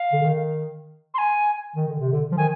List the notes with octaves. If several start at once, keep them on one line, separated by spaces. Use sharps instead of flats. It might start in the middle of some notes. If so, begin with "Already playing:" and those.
Already playing: F5
D3
D#3
C6
G#5
D#3
D3
C3
D3
F3
D#3 G#5